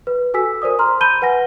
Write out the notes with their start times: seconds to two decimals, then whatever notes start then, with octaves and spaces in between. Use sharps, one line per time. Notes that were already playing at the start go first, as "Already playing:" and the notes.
0.07 B4
0.34 F#4 A4 G#5 E6 B6
0.62 A#4 C5 D5 D#6
0.79 A#5 C6 F6
1.00 A5 B5 G6 D#7 G7
1.22 B4 F#5 G#5 A#6